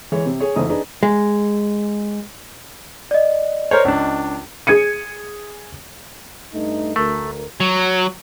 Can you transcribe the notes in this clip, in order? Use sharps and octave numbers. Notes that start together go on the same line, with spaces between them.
E3 G#3 C#5
C3
G#4 C#5
F#1 F2 E3 A3 D#4 D#6
D4 D#4 G#4 B4
G#3
D5 D#5
A#4 C5 C#5
C#2 D4
G#4 G#6 C#7 D#7
G2 A3 D#4
D2 A3 A#4
F#3